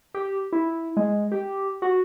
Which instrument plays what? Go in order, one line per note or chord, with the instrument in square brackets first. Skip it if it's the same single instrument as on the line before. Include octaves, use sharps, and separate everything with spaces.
[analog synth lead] G4
E4
G#3
G4
F#4